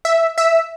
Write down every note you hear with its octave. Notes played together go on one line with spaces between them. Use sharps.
E5
E5